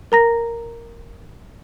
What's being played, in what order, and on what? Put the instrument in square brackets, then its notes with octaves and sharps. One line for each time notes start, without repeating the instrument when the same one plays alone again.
[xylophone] A#4 A#5 A#6